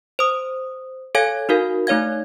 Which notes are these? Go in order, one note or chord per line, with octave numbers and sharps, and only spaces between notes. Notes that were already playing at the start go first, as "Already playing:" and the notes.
C5 D#6
A4 C#5 F5 G#5 G#6
D#4 F#4 A#4 F5
A3 D#4 C#5 F5 G#6